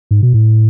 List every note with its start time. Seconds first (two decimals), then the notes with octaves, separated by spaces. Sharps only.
0.11 G#2
0.23 B2
0.34 A2